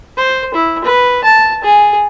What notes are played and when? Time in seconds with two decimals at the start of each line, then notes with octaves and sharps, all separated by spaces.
0.17 C5
0.54 E4
0.84 B4
1.24 A5
1.64 G#4